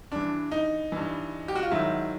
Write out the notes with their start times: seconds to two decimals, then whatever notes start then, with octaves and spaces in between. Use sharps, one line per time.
0.12 G2 E3 D4
0.52 D#4
0.92 G2 E3
1.48 G4
1.55 F#4
1.63 F4
1.71 G#2 D#3 F#3 E4